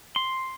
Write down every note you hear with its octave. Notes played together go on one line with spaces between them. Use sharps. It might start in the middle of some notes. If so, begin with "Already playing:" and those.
C6